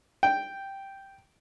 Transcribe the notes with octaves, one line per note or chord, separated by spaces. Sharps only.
G5